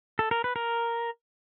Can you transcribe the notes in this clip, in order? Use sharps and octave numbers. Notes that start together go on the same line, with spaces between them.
A4
A#4
B4
A#4